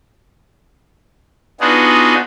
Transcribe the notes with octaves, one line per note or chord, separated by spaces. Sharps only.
B3 D4 D#4 F4 F#4 G#4